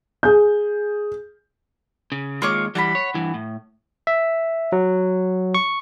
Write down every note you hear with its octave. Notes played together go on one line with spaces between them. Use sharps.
G#4 G6
C#3
D#2 G#3 F4 C#5 D6
E3 G3 F#5 A5 B5
C#5
G2 E3
A2
E5
F#3
C#6